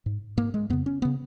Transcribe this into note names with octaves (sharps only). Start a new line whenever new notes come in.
G#2
G#2 A#3
G#3
F2 C#3 B3
C#4
C#3 B3